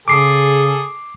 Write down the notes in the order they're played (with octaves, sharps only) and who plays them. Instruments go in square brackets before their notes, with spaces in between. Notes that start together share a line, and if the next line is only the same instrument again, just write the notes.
[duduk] C#3 [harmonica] G#4 A4 [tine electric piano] D6 C7